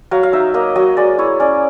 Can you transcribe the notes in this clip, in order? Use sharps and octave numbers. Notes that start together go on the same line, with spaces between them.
F#3 F5
F5
D#4 E5
A#3 D#5
F#3 D#5
G#3 D5
E4 C#5
C#4 D5